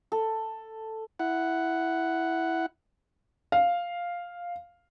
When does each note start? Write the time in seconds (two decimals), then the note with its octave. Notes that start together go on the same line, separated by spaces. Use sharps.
0.12 A4
1.19 E4 F#5
3.52 F5